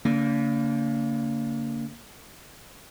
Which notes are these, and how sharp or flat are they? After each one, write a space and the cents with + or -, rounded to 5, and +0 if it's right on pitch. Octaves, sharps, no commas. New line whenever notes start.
D3 -40 A#3 -15